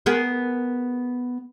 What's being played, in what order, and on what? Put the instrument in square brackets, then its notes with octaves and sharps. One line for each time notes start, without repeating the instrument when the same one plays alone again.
[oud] B3 G#4 A#4